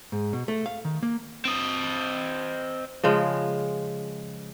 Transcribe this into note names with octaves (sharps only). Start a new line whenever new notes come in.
G#2
B2
A3
F5
D#3
A#3
C4 D#5
C#3 F3 G#3